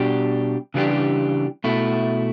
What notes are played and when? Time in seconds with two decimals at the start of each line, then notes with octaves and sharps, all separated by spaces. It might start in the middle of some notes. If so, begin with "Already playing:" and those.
Already playing: B2 G3 D4 G4
0.74 C#3 E3 G3 D4 G4
1.64 B2 A3 E4